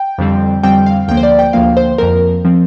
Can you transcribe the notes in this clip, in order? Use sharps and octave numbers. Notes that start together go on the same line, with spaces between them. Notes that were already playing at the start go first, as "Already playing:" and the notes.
Already playing: G5
F2 D3 G3 C4
F2 D3 G3 C4 G5
F5
D2 D3 F3 A#3 G5
C5
D5
G5
D2 D3 F3 A#3 F5
C5
F2 F3 C4 A#4
F3 C4